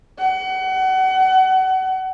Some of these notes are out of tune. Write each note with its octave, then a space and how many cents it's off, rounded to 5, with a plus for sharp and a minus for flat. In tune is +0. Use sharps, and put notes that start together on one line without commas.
F#5 +30